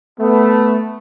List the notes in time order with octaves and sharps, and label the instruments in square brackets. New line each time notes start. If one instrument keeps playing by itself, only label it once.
[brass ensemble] A3 [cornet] B3